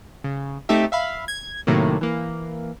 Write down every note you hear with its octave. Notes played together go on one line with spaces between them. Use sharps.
C#3
A3 C4 D#4 G4 A4 E5
E5 F5 B5
G#6
A2 C3 D#3 F#3 A3 A#3
E3 A#3